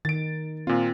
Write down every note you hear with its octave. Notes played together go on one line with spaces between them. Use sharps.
D#3 A6 D7
A#2 C4 F4